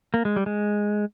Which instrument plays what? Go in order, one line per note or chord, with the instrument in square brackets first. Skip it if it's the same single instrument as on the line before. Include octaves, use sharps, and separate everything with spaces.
[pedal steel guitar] A#3
G#3
G3
G#3